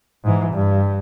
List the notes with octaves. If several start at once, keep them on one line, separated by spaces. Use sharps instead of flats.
G#2 E3
G2